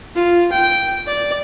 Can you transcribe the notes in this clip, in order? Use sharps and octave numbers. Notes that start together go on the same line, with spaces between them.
F4
G5
D5